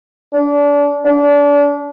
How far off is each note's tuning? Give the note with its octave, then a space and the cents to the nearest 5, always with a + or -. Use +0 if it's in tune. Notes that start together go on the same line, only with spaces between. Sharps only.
D4 -30
D4 -30